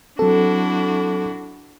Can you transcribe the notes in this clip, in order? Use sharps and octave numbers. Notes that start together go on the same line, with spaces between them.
F#3 C4 D4 E4 F#4 A4